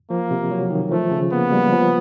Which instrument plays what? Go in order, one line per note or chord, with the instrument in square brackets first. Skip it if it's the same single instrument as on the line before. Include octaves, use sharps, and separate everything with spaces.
[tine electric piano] F3 [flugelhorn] A#3
[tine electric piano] C3
F#3
D#3
[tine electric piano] F3 [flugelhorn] A3
[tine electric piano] C#3
[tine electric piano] A#3 [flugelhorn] B3
[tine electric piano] G3
F3